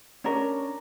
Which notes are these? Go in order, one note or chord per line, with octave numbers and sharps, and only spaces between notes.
C#4 D4 A#4